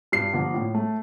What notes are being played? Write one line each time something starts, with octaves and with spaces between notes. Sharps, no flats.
G2 C7
D3 F3 A#3
A2
A3